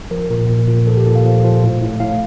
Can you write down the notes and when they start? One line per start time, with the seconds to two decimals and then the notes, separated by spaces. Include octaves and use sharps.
0.11 F3 A#4
0.30 A#2 A#4
0.49 A#2
0.68 A#2
0.86 F3 A4
0.97 G4
1.06 A#2 A4
1.15 F5
1.25 F3
1.44 F3
1.63 A2
1.81 A2
2.00 A2 F5